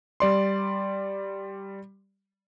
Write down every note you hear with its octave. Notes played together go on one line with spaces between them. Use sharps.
G3 D5 C6